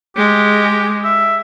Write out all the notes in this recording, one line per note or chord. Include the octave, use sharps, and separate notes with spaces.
G#3 G4
E5